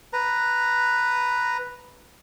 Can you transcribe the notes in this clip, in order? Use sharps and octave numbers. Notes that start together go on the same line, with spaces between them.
B4 A#5